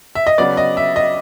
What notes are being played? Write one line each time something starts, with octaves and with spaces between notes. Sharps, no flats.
E5
D#5
C#3 F#3 B3 D5
D#5
E5
D#5